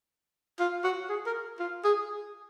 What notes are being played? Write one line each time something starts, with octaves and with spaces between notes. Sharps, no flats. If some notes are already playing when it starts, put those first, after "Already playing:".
F4
F#4
G#4
A#4
F4
G#4